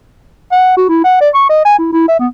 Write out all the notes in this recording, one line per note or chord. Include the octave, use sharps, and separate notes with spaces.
F#5
F#4
E4
F#5
D5
C#6
D#5
G#5
E4
E4
E5
B3